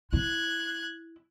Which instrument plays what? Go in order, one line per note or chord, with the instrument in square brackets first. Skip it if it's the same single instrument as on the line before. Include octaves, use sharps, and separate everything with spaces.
[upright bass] E4 [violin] F#6 G#6